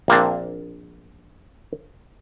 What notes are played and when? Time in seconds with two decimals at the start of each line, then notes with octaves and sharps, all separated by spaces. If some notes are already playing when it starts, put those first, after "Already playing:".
0.08 A#1 A#3 C4 D4